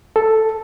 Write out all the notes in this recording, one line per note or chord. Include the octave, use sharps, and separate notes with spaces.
A4